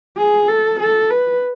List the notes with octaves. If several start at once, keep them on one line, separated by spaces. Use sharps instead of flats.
G#4
A4
A4
B4